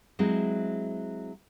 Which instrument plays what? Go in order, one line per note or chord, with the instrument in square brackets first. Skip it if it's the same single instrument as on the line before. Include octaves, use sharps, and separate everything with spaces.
[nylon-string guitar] F#3 G#3 C4 E4